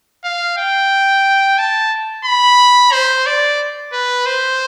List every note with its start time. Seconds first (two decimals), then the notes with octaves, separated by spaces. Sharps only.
0.24 F5
0.57 G5
1.58 A5
2.25 B5
2.92 C5
3.26 D5
3.93 B4
4.26 C5